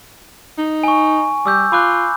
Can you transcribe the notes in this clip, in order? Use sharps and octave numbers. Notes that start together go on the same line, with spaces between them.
D#4
G#5 C#6
G3 D6 E6 G6
F4 B5 D6 F#6